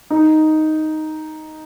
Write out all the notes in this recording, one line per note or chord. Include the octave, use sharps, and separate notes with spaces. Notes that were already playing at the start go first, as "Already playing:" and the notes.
D#4